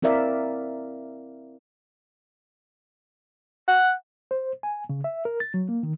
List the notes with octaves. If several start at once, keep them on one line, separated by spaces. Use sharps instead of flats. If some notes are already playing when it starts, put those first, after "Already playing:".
C4 E4 A#4 D5 E5 F5
F#5
C5
G#5
C#3
E5
A#4
A6
F#3
A#3
D#3